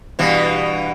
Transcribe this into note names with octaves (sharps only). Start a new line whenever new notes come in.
G2 B2 E3